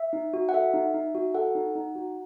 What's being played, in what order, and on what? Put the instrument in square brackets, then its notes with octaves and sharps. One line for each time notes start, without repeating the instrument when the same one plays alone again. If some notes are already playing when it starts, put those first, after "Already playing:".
Already playing: [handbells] E5
D#4
F#4
F#5
A4 E5
D#4
D#4
F#4
A4 F#5
D#4
D#4
F#4